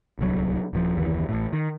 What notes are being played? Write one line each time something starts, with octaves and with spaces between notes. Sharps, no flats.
D1 C2 F#3
D#1 G#2 F3
F#1 D#2 C3 E3
A1 A2
D#3